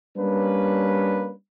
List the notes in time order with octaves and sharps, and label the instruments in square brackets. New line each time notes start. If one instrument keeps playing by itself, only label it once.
[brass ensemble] G3 A#3 C#4 D4 B4